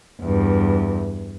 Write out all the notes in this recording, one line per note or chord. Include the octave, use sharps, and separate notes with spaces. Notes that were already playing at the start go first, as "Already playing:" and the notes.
E2 G2